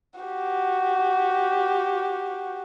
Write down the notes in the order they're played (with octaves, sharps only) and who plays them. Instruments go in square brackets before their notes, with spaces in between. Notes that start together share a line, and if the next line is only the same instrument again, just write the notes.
[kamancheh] F#4 G4